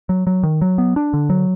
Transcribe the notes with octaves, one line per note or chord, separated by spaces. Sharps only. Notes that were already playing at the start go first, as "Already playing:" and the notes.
F#3
F#3
D#3
F#3
B3
D4
D3
F#3